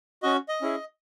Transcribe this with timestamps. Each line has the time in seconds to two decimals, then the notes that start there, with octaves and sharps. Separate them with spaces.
0.23 C#4 F#4 D#5
0.49 D#5
0.62 C#4 E4 G#4